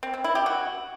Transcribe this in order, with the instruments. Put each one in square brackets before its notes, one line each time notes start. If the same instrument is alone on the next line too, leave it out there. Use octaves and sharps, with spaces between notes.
[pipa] C4
C4
E4
G4
F#4